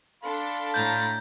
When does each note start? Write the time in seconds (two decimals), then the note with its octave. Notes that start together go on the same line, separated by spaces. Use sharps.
0.23 D4 A4 F5 B5 C6
0.74 A2 A#5 G6 A6